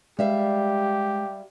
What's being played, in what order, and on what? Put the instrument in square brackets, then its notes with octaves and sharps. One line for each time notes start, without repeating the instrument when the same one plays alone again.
[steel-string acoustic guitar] G3 E5 F5 [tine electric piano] G#3 [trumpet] G4